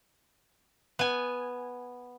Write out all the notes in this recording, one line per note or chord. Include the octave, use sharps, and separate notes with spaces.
B3 G#5